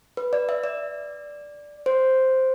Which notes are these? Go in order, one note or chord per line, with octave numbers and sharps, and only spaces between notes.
B4
D5
E5
D5
C5